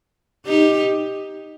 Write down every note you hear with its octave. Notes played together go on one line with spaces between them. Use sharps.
D#4 G4